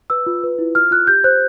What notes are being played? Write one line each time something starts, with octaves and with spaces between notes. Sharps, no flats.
B4 E6
F4
B4
E4
F4 F6
F4 F#6
G4 G6
C5 F#6